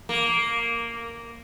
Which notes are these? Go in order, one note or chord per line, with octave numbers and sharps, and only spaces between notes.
A#3